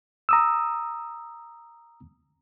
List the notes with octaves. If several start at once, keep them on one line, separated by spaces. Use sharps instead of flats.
A#5 D#6 E6